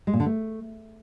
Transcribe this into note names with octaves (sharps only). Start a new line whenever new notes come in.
G#3
A#2
D3
A3